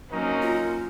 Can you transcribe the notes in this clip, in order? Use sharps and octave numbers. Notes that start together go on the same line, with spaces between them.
F#3 A#3 C4 C#4 D#4 A#4
F4